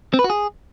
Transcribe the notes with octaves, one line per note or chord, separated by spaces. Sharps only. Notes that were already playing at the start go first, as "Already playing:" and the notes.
C4
B4
F#4
G#4